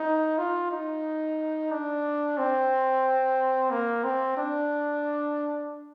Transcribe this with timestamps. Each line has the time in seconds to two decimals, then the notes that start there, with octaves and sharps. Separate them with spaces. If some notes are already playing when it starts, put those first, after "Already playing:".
Already playing: D#4
0.38 F4
0.71 D#4
1.71 D4
2.38 C4
3.71 A#3
4.04 C4
4.37 D4